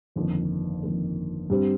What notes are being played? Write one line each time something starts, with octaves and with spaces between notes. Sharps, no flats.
G1 F2 D#3 A#3
G1 F2 D#3 A#3
G2 G3 C4